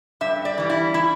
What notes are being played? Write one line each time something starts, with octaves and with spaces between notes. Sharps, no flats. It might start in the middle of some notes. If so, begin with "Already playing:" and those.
G2 E5
D5
E3 G3
E4
E4